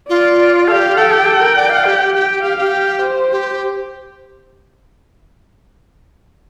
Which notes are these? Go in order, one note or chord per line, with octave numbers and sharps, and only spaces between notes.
F4 D5
G4 A4 F5
A4 G5
G4
A4
A#4
D5
F5
G4
G4 G5
G4 F5
G4
F5
C5
G4